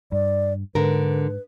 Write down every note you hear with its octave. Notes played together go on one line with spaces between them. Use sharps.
G2 D5
G#2 D3 A#4 B4